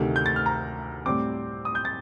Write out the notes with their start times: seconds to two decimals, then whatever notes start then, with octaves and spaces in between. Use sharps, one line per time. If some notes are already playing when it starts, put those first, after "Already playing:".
Already playing: D2 C3 D#3 A3
0.16 G6
0.26 A6
0.36 F6
0.46 A#5
1.06 A2 G3 C4 D6
1.65 D#6
1.75 G6
1.85 A6